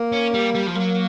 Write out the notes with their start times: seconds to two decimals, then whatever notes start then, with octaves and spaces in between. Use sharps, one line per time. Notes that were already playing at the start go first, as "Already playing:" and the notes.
Already playing: A#3
0.12 C#4
0.34 G3
0.55 G3
0.67 F3
0.75 F#3 A#3